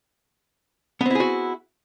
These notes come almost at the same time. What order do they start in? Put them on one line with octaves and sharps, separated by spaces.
B3 C4 E4 G#4 F#4